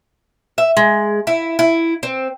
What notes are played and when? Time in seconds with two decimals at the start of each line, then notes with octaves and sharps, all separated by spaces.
0.58 E5
0.77 G#3
1.27 E4
1.59 E4
2.03 C4